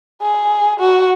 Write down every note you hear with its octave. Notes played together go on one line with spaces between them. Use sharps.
G#4
F#4